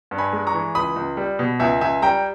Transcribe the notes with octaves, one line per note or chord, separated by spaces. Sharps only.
G2
G#5 B5
G#3
A#5 C#6
E3
C#2 B5 D#6
C#2
G3
B2
C#2 E5 G#5
C#2 E5 G#5
G3 G5 A#5